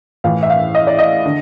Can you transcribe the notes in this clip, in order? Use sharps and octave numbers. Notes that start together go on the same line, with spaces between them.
A2 E3 F5
E5
F5
D#5
D5
D#5
D3